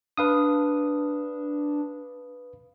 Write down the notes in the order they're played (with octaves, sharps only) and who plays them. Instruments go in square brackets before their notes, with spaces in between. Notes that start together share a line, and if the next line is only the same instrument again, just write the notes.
[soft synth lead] D4 [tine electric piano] B4 F5 D#6